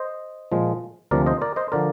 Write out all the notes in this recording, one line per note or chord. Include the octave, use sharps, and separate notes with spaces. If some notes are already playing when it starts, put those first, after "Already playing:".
Already playing: C5 D#5
A#2 F3 G#3
D2 C3 F3 A#3 A#4 D5
C5 D#5
A#4 D5
C5 D#5
D3 F3 A#4 D5